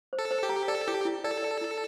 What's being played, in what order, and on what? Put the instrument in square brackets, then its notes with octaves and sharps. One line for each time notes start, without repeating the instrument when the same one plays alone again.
[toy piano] C5
[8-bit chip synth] A4
[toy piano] C5
[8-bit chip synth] G4
[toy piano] A#5
[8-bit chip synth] A4 [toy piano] D5
[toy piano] E4 [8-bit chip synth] G4
[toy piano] E4
[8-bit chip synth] A4 [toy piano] D5
[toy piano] D5
E4